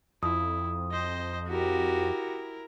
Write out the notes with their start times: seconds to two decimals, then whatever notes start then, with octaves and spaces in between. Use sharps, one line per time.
0.23 F2 E4 D#6
0.91 C5 D#5
1.48 E4 F#4 G4 A#4